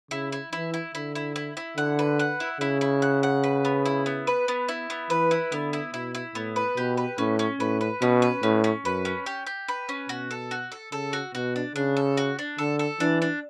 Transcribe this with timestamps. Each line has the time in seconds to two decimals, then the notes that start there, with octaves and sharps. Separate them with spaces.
0.11 C#3 E4
0.32 E4
0.53 E3 E4
0.74 E4
0.95 D3 E4
1.15 E4
1.36 E4
1.57 E4
1.77 D3 F#5
1.99 B4
2.19 F#5
2.40 E4
2.61 C#3 E4
2.81 E4
3.02 F#5
3.23 F#5
3.44 B4
3.65 B3
3.85 E4
4.06 B3
4.27 B4
4.48 B3
4.69 E4
4.90 B3
5.10 E3 B4
5.31 E4
5.51 D3 B3
5.73 E4
5.93 B2 E4
6.15 E4
6.35 A2 B3
6.56 B4
6.77 B2 G4
6.97 B4
7.18 A2 C#4
7.39 C#4
7.60 A2 B4
7.81 B4
8.02 B2 C#4
8.22 B4
8.43 A2 C#4
8.64 C#4
8.85 F#2 B4
9.05 C#4
9.26 G4
9.47 G4
9.68 B4
9.89 C#4
10.09 B2 F#4
10.31 A4
10.51 F#4
10.72 A4
10.92 C#3 A4
11.13 F#4
11.34 B2 F#4
11.56 D4
11.76 C#3 D4
11.97 A4
12.17 F#4
12.39 D4
12.58 D3 A4
12.79 A4
13.00 E3 D4
13.22 D4